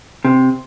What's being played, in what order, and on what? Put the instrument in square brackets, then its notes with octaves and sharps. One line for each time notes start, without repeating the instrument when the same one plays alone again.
[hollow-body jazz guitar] C3